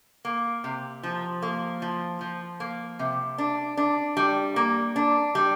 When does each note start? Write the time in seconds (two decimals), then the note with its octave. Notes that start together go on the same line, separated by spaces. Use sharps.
0.25 A#3
0.64 C3
1.03 F3
1.42 A#3
1.82 F3
2.21 F3
2.60 A#3
2.99 C3
3.38 D4
3.77 D4
4.17 G3
4.56 A#3
4.96 D4
5.35 G3